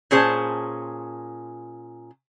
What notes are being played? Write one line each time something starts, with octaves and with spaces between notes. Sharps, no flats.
A#2 C#4 G#4 C5 A5